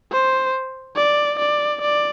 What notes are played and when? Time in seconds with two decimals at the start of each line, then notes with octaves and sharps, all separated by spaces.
0.12 C5
0.97 D5
1.39 D5
1.82 D5